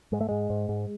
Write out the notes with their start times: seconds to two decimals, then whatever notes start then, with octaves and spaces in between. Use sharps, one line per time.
0.12 G#2 G#3
0.21 A3
0.29 G#2 G#3
0.50 G#2
0.69 G#2